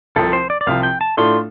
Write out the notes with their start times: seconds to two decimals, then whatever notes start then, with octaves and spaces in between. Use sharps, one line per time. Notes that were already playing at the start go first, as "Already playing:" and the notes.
0.16 C2 C3 F3 C4 A4
0.33 C5
0.50 D5
0.61 D5
0.66 C2 C3 F3 C4 F5
0.83 G5
1.01 A5
1.17 A2 A3 D4 F4 A4 C6